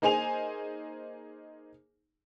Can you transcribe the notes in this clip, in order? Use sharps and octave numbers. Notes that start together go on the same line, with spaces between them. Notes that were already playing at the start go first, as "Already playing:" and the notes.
A#3 D#4 G#4 C5 G#5 F7